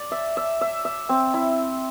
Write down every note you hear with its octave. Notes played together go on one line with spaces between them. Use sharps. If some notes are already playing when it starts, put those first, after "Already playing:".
Already playing: D5
E5
E5
E5
E5
C4
E4